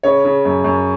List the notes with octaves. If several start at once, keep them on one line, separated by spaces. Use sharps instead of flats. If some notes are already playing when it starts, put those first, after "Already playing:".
C#3 C#5
C#3
F#2
F#2